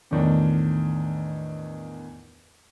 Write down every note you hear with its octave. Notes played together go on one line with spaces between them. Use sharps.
E2 A2 D#3 D4